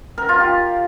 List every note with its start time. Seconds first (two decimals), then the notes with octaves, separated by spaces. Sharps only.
0.18 A#4
0.29 F4
0.40 G4